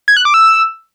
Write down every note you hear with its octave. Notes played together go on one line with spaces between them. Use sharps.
G#6
F#6
D6
E6